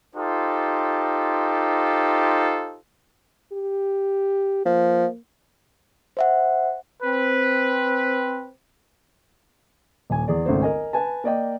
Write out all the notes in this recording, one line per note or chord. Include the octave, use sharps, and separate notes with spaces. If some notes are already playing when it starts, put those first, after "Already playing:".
D#4 F4 G4 A4 C5
G4
F3 A#3
C5 E5 F#5
C4 B4
D#1 G#5
E2 G#4 D5
G#1 C#2 A3 C5
A#4 D#5 G#5
B4 G#5 A5
A#3 D5 D#5 G5